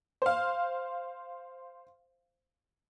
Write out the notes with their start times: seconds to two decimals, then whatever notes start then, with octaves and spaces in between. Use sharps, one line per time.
0.22 C5 F5